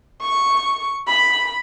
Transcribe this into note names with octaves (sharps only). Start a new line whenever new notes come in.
C#6
B5